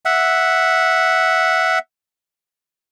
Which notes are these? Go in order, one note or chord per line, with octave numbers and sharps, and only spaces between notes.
E5 F#5